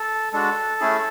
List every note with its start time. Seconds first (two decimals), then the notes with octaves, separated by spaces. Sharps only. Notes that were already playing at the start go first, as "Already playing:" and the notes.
Already playing: A4
0.33 G#3 D4 F#4 A4
0.80 A3 C#4 E4 G#4